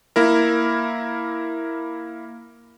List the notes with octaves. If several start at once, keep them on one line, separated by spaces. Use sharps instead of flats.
A#3 E4 A#4